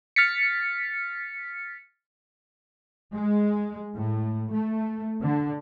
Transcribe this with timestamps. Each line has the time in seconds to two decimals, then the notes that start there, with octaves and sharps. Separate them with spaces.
0.16 F6 A6 B6 C#7
3.15 G#3
3.96 A2
4.53 A3
5.21 D3